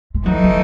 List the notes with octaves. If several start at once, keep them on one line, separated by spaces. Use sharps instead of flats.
G#3
E3 F#3 A3 D#4
F#3